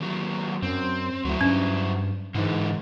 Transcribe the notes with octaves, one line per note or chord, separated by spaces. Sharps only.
D#2 F#3
F#2 C4
D2 F#3 E4
G2 C#4
G#2 D3 E3